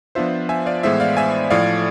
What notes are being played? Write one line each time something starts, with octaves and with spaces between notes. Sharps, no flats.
F3 B3 D4 F4 C5 E5
E5 G#5
D5 F5
A2 E3 G#3 B3 E4 C5 E5
D5 F5
E5 G#5
A2 F3 A3 D5 F5